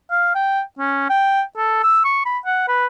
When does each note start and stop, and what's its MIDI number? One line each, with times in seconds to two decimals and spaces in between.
0.11 0.35 77
0.35 0.61 79
0.79 1.05 61
1.10 1.42 79
1.57 1.81 69
1.83 2.03 88
2.05 2.25 85
2.25 2.38 83
2.45 2.66 78
2.68 2.86 71